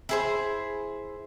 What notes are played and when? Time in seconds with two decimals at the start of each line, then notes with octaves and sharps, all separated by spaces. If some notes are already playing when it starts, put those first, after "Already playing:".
0.09 E4 G#4 C5